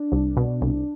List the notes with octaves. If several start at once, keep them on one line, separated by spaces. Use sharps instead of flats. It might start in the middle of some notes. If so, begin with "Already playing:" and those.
Already playing: D4
C2
B2
C2